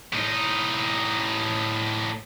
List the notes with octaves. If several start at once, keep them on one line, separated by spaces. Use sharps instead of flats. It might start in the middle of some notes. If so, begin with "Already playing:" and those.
A2 D#4